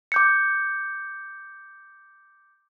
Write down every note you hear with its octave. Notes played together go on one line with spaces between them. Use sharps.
D6 G6 C#7